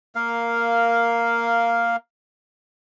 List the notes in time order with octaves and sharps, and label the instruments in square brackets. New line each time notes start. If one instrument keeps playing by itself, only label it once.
[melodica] A#3 A#4 F5